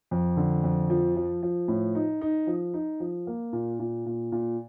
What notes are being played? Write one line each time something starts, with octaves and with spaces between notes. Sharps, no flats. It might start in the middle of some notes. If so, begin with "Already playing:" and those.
F2
D3
F2
F3
F3
F3
A2
D#4
D#4
F3
D#4
F3
A#3
A#2
A#2
A#2
A#2